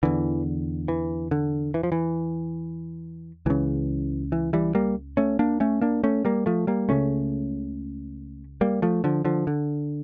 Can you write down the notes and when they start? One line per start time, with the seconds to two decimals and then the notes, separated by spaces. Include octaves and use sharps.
0.03 E2 D3 E3
0.88 E3
1.31 D3
1.74 E3
1.83 F3
1.92 E3
3.46 C#2 C#3 E3
4.32 E3
4.53 E3 G3
4.75 G3 A#3
5.17 A3 C#4
5.39 A#3 D4
5.60 A3 C#4
5.81 A#3 D4
6.03 A3 C#4
6.25 G3 A#3
6.46 F3 A3
6.67 G3 A#3
6.89 C#2 C#3 A3 C#4
8.61 G3 A#3
8.82 F3 A3
9.04 D3 F3
9.25 D3 F3
9.47 D3